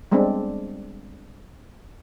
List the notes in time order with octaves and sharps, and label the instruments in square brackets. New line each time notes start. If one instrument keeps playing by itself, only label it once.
[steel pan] G3 G#3 B3 C4 D4